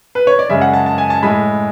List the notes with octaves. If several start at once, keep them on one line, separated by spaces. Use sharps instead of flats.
B4
C#5
D5
F#2 C#3 G#3 E5
F#5
A5
A5
G#5
A5
A2 G#3 B5